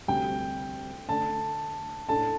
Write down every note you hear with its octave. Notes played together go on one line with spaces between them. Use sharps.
D2 C3 G3 C4 G5
D3 A3 D4 A5
A2 A3 D4 A4 A5